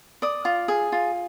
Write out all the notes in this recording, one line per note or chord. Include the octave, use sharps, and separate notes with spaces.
D5 D#6
F4
G#4
F4